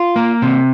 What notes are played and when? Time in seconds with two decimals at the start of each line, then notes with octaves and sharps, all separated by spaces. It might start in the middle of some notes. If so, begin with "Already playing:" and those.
Already playing: F4
0.16 A#3
0.42 C3